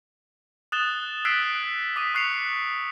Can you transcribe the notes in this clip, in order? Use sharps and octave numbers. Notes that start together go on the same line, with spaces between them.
D#6 F#6 A6 E7 G7
E6 F#6 G#6 B6 C7 D7
D6 D#6 B6 D#7
C#6 F#6 C7 C#7 F7